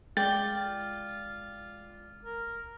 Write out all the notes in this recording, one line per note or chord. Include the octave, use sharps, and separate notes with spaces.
G#3 F4 D5 G5 A6
A#4